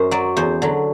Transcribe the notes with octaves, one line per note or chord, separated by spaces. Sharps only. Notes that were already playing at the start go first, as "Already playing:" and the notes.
Already playing: F#2 C5
F#3 D5
E2 C5
D3 F#3